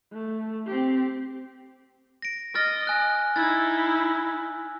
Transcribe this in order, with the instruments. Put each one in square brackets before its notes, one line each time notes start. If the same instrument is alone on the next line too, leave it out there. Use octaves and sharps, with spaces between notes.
[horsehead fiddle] A3
C4 G4
[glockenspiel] A#6 D7
[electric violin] D#5 [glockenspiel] F6 A6 A#6
[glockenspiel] G#5 F#6
[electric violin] D#4 E4 [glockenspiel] E6 G#6 A6